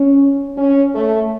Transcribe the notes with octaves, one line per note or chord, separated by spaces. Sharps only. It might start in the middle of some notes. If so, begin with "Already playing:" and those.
Already playing: C#4
C#4
A3